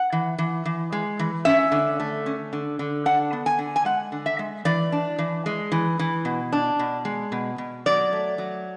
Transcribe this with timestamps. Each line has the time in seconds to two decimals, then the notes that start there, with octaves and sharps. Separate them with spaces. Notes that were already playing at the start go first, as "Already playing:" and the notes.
Already playing: F#5
0.12 E3
0.39 E3
0.65 E3
0.92 G#3
1.19 E3
1.45 C#4 E5
1.72 D3
2.00 A3
2.26 C#4
2.53 D3
2.79 D3
3.06 D4 F#5
3.33 B3
3.46 G#5
3.59 D3
3.76 G#5
3.85 G#3 F#5
4.12 D3
4.26 E5
4.39 G#3
4.65 E3 D5
4.92 D4
5.19 E3
5.46 G#3
5.72 E3
5.99 E3
6.25 B2
6.53 D4
6.79 B2
7.05 G#3
7.32 B2
7.58 B2
7.86 F#3 D5
8.13 A3
8.38 F#3